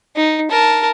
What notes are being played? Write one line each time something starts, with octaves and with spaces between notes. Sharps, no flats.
D#4
A#4 A5